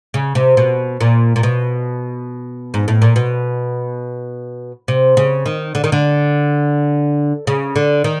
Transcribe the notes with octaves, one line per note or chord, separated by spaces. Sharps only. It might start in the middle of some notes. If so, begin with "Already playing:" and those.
C#3
C3
B2
A#2
A#2
B2
G#2
A2
A#2
B2
C3
C#3
D#3
D3
D#3
D3
C#3
D3
D#3